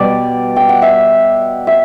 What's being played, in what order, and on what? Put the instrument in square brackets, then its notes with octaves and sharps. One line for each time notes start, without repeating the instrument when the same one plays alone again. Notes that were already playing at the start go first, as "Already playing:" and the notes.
Already playing: [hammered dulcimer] B2 G3 D5
G5
F#5
E5
E5